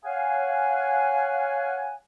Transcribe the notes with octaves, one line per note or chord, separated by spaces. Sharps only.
C#5 F5 F#5 G#5